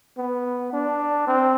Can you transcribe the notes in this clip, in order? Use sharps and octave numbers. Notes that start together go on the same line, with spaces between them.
B3
D4
C4